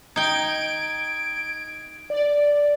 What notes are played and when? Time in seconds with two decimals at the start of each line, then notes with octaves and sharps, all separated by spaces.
0.16 D#4 G5 G#6 D7
2.10 D5